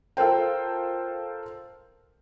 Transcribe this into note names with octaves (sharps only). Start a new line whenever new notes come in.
F4 A4 A#4 C5 G5